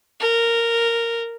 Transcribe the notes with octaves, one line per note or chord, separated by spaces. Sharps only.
A#4